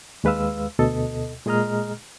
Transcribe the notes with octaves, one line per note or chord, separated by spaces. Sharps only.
D#2 G#3 B4 F5 E6
D2 B2 A4 D#5
A#2 G#3 G#4 D#5 A#5 F6